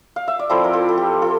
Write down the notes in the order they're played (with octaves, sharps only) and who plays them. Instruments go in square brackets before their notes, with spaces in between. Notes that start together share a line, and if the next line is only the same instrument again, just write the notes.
[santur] F5
E5
D5
F3 C4 E4 A4 C5
A#4
F4 A4
A4
G4
F4 A4